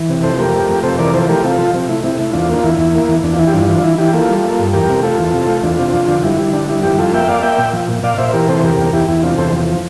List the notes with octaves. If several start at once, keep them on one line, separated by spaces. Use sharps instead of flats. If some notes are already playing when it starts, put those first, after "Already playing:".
Already playing: E3
C3
F2 A4 C5
A3 G4 A#4
A3
F2
C3 A4 C5
E3 A#4 D5
F3 A4 C5
A3 G4 A#4
C3 F4 A4
F3
C3
A3 E4
C3 E4
A3
E2 D4 F4
A#3
F4
E2 E4
E2
A#3
E2
E2 D4
F4
E3 E4
G4
G2 D4 F4
E3 D4 F4
E3 E4
E3 E4 G4
A#3 F4 A4
G3
A#3
G2
E2 G4 A#4
C3
A3 F4 A4
E2
C3
A3
E2 D4 F4
C3
F2
D3
G3 E4
G3
D3 D4
G3 E4
F2 E4 G4
F2 F4 A4
A#3 E5 G5
A#3 D5 F5
A#3 E5 G5
A#2
F3
A#2
A#2 D5 F5
A#2 C5 E5
E3 G4 A#4
C3 A4 C5
E2 G4 A#4
E2
E2 E4 G4
E2 E4
C3 D4 F4
E2 A4 C5
F3